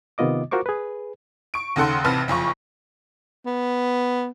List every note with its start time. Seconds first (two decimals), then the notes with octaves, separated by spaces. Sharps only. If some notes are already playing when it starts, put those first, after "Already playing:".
0.18 C3 D#3 B3 F4 D#5 D6
0.51 F4 F#4 A#4 C5 C#6 D6
0.66 G#4 B4
1.54 C#6 D7
1.76 D#2 C#3 A4 F#5 C6
2.04 A1 C3 B4 A5 F6
2.28 F#1 F2 F4 C#6
3.46 B3